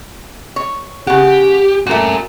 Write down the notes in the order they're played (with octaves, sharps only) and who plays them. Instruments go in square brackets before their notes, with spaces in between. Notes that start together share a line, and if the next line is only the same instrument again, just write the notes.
[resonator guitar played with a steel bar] C#5
[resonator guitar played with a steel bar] C#3 F#5 [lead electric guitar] G4
[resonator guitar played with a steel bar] A#2 A3 [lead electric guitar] F#4 A#4